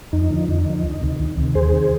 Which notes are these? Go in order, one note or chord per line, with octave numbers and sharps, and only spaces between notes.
F2 D#4
D3 F3
F2
D3 F3
D2
C3 D#3
D2
C3 D#3
D#2 G#4 C5
D#3